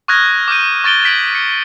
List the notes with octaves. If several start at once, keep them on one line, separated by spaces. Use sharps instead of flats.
C#6 D#6 F6 F#6 G#6 A#6
D6 F6 G6 D#7
C#6 A6 D7 G7
G#6 B6 D7 F#7
C#7